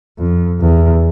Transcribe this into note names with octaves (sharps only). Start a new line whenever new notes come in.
F2
E2